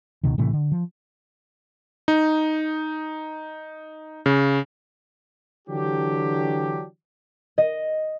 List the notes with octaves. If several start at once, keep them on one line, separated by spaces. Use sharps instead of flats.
C#2 B2 D#3
A2 C3 E3 A3
D3
F3
D#4
C#3
D3 E3 F#3 D4 G4
D#5